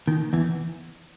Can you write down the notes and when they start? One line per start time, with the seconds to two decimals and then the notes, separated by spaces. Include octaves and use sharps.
0.07 D#2 D#3
0.33 E2 E3